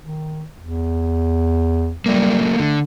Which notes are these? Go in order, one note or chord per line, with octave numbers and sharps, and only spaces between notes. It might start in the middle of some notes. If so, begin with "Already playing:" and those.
D#3
E2
F#3 G3 A3 A#3
D3 A3